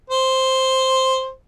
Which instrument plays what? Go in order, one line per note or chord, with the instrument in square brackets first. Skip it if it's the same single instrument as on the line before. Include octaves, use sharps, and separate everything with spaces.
[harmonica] C5